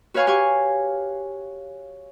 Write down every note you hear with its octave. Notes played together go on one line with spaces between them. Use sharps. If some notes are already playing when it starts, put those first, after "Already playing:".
F#4 B4 C#5 F5 G#5 C#6
G4 F5 G#5 C#6